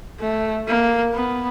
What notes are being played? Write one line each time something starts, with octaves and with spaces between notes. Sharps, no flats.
A3
A#3
B3